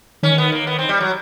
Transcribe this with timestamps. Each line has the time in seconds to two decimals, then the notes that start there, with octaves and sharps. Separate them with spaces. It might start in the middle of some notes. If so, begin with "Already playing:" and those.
0.23 D#3 C#4
0.38 B3
0.52 A#3
0.67 B3
0.79 C4
0.89 G3
1.00 F#3